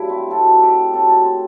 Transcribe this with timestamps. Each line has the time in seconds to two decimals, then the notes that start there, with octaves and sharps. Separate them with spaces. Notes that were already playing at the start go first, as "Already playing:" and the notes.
Already playing: G2 F#3 A3 E4
0.09 C4
0.30 C3 F#3 A3 A4
0.62 G4
0.93 C3 F#3 A3 A4
1.09 A4
1.24 C5